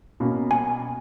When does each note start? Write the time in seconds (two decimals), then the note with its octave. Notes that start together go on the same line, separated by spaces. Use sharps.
0.20 B2 A#3 C#4
0.51 G#5